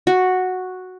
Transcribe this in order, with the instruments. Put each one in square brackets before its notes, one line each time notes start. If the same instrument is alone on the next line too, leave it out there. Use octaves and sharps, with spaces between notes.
[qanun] F#4